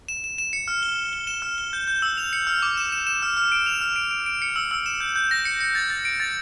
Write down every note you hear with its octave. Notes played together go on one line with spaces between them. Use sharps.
E7
E7
E7
C#7
F6
G7
G7
G7
E7
F6
G7
G6
G6
E6
F7
C#7
F6
D6
E7
E7
E7
F6
F6
D7
F7
F6
D7
D7
D7
C#7
E6
E6
E7
G6
G6
A#6
C#7
C#7
A6
A6
D7
A6